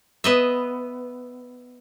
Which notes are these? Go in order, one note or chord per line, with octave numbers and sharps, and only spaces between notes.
B3 D#5 E5